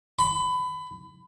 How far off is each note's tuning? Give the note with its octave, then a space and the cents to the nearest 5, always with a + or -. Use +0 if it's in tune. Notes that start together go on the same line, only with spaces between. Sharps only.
B5 +25